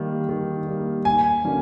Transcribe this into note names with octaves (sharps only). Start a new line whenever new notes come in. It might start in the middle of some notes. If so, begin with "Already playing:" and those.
Already playing: D#3 G3 A#3
D#3
G3 A#3
D#2 G#5
D3 F#3 A#3 C#4